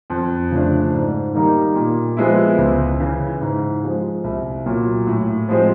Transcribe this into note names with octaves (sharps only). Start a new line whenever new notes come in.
F2
C#3 F3 A3 D4
G#2
D#3 G3 A#3 D#4
A#2
F3 G#3 B3 E4
C#2
C#3 E3
G#2
F3 G#3
C2
A#2 F#3
A2
F3 G#3 C4